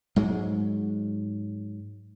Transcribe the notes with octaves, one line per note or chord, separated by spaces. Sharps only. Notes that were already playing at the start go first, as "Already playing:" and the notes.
G#2 F#3 G#3